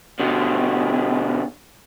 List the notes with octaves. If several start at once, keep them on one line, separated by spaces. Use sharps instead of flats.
B2 D3